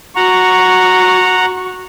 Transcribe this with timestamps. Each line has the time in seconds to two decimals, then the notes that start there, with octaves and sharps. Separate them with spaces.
0.16 F#4 F#5 A#5 C#6